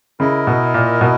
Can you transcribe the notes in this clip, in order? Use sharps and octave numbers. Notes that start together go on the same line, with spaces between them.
C#3 E4 A#4 D#5
B2
A#2
B2